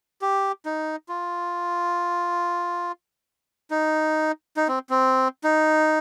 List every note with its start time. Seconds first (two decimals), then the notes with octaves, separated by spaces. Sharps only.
0.22 G4
0.66 D#4
1.09 F4
3.71 D#4
4.57 D#4
4.68 C4
4.90 C4
5.44 D#4